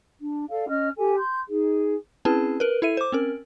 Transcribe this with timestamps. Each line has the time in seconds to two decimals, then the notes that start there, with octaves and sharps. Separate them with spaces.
0.20 D4
0.49 A4 D5 F5
0.68 C#4 D#5 F6
0.96 G4 A4 G#5
1.17 C6 G6
1.48 D#4 G#4
2.25 C4 C#4 E4 G#4 B4 A5
2.60 A#4 B4
2.82 E4 A4 E5 D#7
2.97 C5 D6
3.12 C4 C#4 A#4